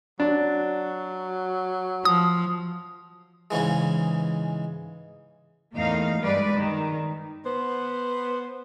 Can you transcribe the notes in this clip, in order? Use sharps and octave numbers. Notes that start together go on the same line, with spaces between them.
F#3 D4
F3 D#6
G#2 C#3 E3 G#3
E2 A2 A#3 D#4 F5
G2 G3 G#3 B4 D5
D#3
B3 C5